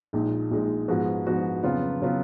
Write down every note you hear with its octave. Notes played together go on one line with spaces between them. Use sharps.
A#1 A#2 G#3 D#4
A#1 A#2 G#3 D#4
G#2 F3 G#3 B3 F#4
G#2 F3 G#3 B3 F#4
F2 C#3 F#3 B3 F4
C#3 F#3 B3 F4